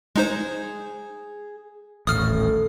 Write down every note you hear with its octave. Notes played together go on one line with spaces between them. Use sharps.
G#3 D#4 G#4 C5
D#1 A1 A2 D#6 F6